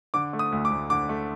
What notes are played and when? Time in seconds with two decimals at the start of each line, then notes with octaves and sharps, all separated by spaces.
0.14 D3 D6
0.33 A3
0.39 D#6
0.52 D2
0.65 D6
0.71 D2
0.90 D3 D6
1.09 A3